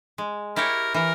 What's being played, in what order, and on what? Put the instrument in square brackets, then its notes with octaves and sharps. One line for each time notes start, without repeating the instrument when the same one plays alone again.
[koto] G#3
[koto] E4 G4 C#5 [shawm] A#4
[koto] E3 [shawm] A#4